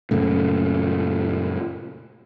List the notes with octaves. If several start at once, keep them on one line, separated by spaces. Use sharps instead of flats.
F#2 A#2 C#3 A3